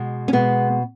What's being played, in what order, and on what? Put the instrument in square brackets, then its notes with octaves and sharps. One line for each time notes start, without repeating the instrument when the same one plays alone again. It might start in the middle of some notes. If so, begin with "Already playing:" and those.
Already playing: [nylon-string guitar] B2 G#3
C#4
B2 G#3 B3